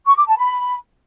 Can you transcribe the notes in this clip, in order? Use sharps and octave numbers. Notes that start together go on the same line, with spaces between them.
C#6
D6
A5
B5